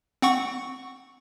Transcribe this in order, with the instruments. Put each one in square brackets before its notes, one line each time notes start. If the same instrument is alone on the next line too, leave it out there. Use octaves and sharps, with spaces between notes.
[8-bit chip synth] C4 F#5 C#6